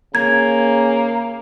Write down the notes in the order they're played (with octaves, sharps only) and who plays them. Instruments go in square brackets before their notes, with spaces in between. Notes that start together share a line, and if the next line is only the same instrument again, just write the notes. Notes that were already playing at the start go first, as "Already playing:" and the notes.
[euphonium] C#3 [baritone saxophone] A#3 [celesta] G#6